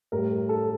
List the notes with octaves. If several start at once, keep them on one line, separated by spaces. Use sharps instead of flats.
A2 G3 A#4
A4